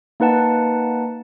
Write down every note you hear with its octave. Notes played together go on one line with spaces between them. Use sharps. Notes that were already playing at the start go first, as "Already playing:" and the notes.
A#3 D#4 B4 F#5 A5